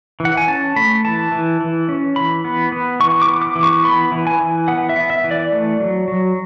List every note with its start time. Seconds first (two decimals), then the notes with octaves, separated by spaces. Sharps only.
0.20 E3
0.25 F#5
0.37 G#5
0.48 C#4 A5
0.76 A3 B5
1.05 E3 A5
1.32 E3
1.61 E3
1.89 C#4
2.16 E3 B5
2.45 B3
2.72 B3
3.00 E3 C#6
3.22 D6
3.28 B3
3.42 D6
3.56 E3
3.63 C#6
3.84 B3 B5
4.12 E3
4.27 G#5
4.40 E3
4.68 B3 F#5
4.89 E5
4.96 B3
5.10 E5
5.24 E3
5.31 D5
5.52 A3
5.80 F#3
6.08 F#3